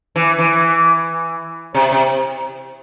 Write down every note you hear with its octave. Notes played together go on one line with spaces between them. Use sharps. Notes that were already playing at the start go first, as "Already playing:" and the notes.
E3
E3
C3
C3